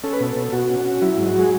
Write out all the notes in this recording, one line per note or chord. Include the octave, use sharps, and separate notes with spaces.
C#4 A4
B4
B2 A4
B2
B2 F#4
C#4
C#4
F#3 E4
G#2
F#4
F#3
G#4